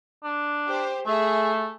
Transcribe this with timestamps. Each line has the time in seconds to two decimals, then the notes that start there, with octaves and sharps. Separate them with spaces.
0.24 D4
0.67 G4 C5
1.06 A3 G#4 E5